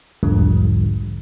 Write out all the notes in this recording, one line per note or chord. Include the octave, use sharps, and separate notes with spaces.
B1 E2 G#2 D3 F3 G3